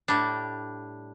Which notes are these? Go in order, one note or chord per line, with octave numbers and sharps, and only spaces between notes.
A2 G3 D4